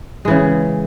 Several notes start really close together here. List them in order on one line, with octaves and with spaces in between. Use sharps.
G#3 E3 C#3